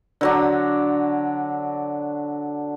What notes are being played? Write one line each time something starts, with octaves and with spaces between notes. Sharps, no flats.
D3 F#3 D4